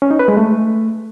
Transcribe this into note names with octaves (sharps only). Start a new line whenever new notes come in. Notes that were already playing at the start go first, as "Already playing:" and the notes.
C#4
D#4
B4
G#3
A3